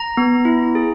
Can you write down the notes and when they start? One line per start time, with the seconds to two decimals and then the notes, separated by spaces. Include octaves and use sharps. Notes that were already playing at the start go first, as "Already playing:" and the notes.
Already playing: A#5
0.17 B3
0.45 E4
0.75 G#4